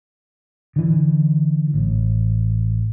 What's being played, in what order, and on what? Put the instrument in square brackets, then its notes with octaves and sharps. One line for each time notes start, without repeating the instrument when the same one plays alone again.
[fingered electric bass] D3 E3
A1